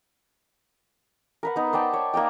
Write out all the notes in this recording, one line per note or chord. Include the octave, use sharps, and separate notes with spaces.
A#4 B4 F#5
B3 D#4
C5 D5 G5 A5
C#5
A#3 D#4 D5 G5